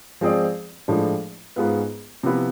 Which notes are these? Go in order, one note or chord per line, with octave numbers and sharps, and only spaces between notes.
F3 G#3 C4 G#4 D5
A2 F3 G#3 D4
G#2 G#3 B3 F4 B4
C3 F3 B3 E4 B4